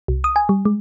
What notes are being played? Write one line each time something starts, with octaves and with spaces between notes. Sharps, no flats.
C2
D#6
G#5
G3
G#3